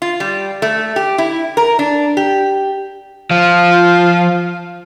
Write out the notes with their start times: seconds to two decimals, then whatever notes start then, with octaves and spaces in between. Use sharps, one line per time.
0.02 F4
0.20 G3
0.62 A3
0.96 G4
1.18 E4
1.57 A#4
1.79 D4
2.17 G4
3.31 F3 F4